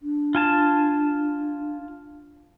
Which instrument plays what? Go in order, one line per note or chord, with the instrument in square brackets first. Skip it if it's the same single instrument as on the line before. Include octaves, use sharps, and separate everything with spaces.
[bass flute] D4
[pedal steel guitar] F4 G#5 A5